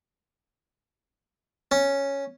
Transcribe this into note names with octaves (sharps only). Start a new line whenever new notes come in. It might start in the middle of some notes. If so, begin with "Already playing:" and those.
C#4